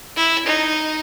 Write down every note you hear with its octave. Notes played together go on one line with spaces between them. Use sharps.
E4
D#4